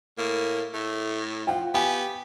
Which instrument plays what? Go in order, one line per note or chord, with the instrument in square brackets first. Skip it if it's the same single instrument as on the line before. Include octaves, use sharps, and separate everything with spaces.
[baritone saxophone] A2 [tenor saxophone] A#3
[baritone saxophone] A2 [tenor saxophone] A3
[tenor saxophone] F3 [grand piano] F4 F#5 G5
[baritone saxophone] B3 [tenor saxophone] G4 [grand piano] F5 G5 G#5